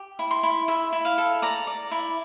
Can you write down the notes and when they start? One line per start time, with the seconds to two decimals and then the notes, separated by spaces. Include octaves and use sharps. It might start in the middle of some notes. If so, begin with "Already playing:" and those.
Already playing: G4
0.19 E4
0.31 C6
0.43 E4
0.68 E4 E5
0.92 E4
1.05 F5
1.18 A4
1.42 D5 A#5
1.67 D5
1.92 E4